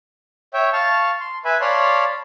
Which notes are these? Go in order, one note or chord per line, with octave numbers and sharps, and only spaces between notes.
C#5 E5 G5
F5 A5 C#6
C6
B4 E5 G#5 B5
C#5 D5 F5 A5 B5 C6